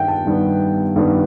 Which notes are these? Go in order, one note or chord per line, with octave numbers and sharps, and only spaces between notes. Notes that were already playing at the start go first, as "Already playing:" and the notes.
Already playing: G2 D#3 G3 B3 E5 F#5 G5
A5
G2 D#3 G3 B3
G2 D#3 G3 B3